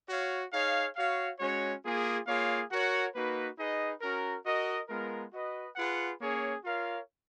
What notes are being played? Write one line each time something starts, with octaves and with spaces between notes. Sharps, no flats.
F#4 C#5 F5
D#4 G#4 C#5 F5
F#4 C#5 F5
G#3 C#4 F#4 C#5
A#3 F4 G#4
A#3 F4 G#4 C#5 F5
F#4 A#4 C#5 F#5
A#3 D#4 F#4 B4
D#4 G#4 B4 D#5
C#4 F#4 A#4
F#4 A#4 D#5
G#3 B3 F4 A#4
F#4 B4 D#5
F4 G#4 B4 F#5
A#3 C#4 G#4 C#5
F4 A#4 C#5 F5